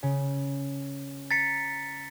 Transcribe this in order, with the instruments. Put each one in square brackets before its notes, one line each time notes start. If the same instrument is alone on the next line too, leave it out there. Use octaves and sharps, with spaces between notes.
[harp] C#3
[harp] A#5 [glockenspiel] A6 B6 C#7